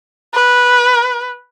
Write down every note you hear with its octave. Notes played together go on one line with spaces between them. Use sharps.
B4